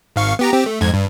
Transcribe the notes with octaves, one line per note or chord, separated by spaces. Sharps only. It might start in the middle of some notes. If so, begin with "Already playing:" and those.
G#1 F5 C#6
B3 G4 A#5
C4 G4
A3
F2 G#2 G#6
G2